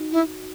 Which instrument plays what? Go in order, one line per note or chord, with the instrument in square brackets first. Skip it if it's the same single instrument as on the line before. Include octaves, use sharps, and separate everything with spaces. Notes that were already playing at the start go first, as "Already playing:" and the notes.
Already playing: [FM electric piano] D#4 F#4
[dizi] E4